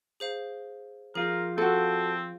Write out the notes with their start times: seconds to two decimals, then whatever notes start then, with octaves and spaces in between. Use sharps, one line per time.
0.20 G#4 C5 F5
1.15 F3 F4 G#4 A#4
1.58 C4 F#4 A4